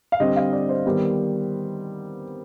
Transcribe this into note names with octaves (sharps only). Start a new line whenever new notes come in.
F5
D3 G3 C4 D#5
F5
D5
C5
D#3 G3 B3